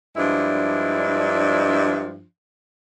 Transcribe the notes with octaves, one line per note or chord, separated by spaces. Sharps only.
G2 F3 G#3 D4 E4